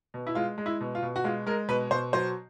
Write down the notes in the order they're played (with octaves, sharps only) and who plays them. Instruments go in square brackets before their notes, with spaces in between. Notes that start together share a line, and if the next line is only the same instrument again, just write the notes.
[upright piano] B2
E4
G#3 F4
G#3
E4
B2
F4
B2
F#4
G#3 F4
G#3 A#4
B2 B4
B2 C5
F#3 C5